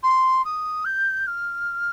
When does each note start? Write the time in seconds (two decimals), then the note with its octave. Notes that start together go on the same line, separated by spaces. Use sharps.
0.03 C6
0.44 D#6
0.85 G6
1.27 F6